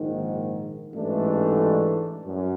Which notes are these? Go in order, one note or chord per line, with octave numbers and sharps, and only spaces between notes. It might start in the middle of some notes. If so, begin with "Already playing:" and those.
Already playing: A#1 G#2 D#3
A1 G#2 E3 A3 D4
F#2